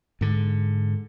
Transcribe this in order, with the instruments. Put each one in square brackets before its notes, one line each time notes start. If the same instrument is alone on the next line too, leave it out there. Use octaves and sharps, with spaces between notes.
[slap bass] G#2 D3